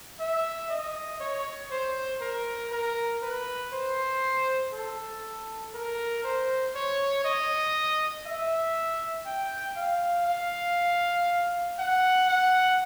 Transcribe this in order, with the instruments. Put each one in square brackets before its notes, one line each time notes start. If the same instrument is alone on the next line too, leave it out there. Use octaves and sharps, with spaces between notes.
[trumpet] E5
D#5
C#5
C5
A#4
A#4
B4
C5
A4
A#4
C5
C#5
D#5
E5
G5
F5
F5
F#5
F#5